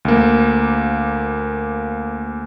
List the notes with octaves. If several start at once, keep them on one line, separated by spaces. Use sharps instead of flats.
D2 A#3